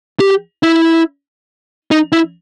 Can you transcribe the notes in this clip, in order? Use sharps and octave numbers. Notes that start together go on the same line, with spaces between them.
G4
E4
D#4
E4